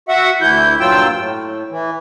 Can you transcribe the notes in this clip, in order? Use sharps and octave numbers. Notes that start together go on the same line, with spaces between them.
F#4 E5 F#5
D2 E3 E4 G6
G2 A#2 F#3 F4 G5 E6
A2
E3